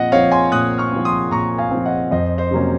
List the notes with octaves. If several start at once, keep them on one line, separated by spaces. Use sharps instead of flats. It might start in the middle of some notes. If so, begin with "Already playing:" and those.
Already playing: A#2 F3 C4 D#5 F#5
F3 C4 C#5 F5
G#5 C6
A#2 D#6 F#6
C#6 F6
F3 C4
C6 D#6
A#2 A#5 C#6
F5 G#5
F3 C4
D#5 F#5
F2 C5 D#5
C5
C3 F#3 A#3 C#4